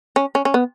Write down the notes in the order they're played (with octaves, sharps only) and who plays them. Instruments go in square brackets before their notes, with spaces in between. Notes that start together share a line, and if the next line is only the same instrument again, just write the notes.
[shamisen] C#4
C#4
C#4
B3